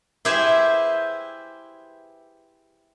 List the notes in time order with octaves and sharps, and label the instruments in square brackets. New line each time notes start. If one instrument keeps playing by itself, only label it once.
[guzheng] E4 G4 G#4 B4 C5 E5